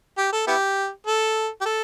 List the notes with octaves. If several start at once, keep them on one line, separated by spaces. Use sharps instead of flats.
G4
A4
B3 E4 G4
A4
G4
A4